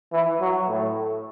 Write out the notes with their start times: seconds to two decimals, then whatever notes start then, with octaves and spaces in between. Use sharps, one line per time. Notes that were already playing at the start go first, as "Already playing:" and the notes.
0.13 E3
0.41 F#3
0.68 A2